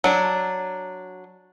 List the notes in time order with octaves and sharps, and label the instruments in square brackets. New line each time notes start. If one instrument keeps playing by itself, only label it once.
[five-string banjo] F#3 D4